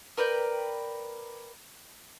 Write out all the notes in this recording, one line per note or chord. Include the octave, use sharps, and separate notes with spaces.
A#4 B4 D5 G5